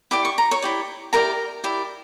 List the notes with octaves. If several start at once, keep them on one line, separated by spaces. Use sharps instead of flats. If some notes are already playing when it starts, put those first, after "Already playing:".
E4 G4 D5 D6
C#6
A#5
C#5 C#6
E4 G4 D5
E4 G4 A#4 D5 A#5
E4 G4 D5